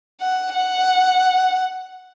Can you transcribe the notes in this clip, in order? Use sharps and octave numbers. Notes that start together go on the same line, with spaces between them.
F#5
F#5